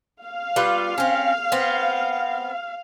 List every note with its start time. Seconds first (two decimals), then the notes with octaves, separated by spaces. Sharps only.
0.24 F5
0.56 G3 F4 B4
0.98 C4 C#4
1.52 B3 C4